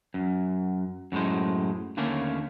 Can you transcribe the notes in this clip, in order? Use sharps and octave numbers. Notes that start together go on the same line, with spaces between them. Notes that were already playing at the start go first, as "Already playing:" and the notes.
F#2
F#2 A2 G#3 C5
D#2 D3 A3 A#3 C#4